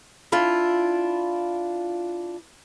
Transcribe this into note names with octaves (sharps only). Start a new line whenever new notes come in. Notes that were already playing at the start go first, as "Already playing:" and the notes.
D4 E4 F4